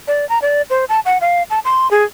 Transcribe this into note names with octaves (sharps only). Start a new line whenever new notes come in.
D5
A#5
D5
C5
A5
F#5
F5
A5
C6
G#4